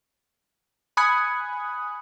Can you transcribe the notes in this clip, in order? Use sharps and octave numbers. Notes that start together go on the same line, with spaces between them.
G#5 B5 D#6 F#6 G#6 C#7